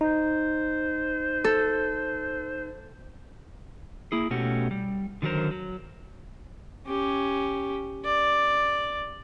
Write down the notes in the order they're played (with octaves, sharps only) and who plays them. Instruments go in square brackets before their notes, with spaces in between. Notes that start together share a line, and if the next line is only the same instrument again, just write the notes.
[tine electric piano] D#4 [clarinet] C5
[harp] A4
[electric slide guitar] A#3 E4 G#4
B2 A3 C#4 F#4 G4
G3
D3 D#3 F#3 F#4 A#4 C5
F#3
[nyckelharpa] C#4 G4
D5